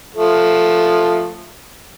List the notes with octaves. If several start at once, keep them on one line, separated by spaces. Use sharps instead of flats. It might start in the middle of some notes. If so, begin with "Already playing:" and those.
F3 A3